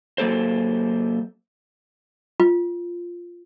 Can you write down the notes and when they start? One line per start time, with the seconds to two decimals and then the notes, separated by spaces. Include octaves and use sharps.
0.18 F#3 A#3 A4 C5
2.40 F4